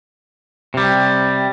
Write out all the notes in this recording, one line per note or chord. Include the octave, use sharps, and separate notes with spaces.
C3 G3